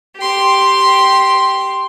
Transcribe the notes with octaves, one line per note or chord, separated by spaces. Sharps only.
G4 C6